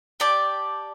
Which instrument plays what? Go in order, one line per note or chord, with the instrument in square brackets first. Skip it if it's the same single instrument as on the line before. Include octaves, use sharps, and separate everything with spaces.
[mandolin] G4 D5 A5